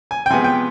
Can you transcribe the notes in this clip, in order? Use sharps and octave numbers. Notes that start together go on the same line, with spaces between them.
G#5
G5
C3 F3 G#3 B3 G#5
G5